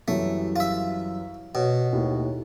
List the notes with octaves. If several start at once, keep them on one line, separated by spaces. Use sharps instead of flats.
F#2 E3 G3 A3
F4 E5
B2 C#5
D#2 A2